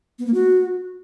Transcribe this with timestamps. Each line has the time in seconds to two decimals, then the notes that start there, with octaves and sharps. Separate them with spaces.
0.19 B3
0.26 A#3
0.34 F#4